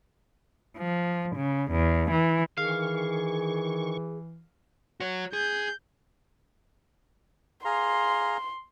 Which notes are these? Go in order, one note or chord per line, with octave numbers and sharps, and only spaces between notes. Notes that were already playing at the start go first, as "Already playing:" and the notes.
F3
C#3
E2
E3
D#3 E3 G#4 F5 C#6
F#4 C#5
G#4 G6
G#4 F5 A#5 C6